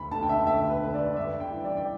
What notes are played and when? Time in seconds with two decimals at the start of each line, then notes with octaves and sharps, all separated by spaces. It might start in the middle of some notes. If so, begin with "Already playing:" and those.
Already playing: D2 B5
0.11 D3 A5
0.23 G5
0.29 E5
0.46 D2 E5
0.70 B4
0.81 D3 B4
0.94 D5
1.17 G2 E5
1.40 G5
1.53 E3
1.64 D5
1.77 G5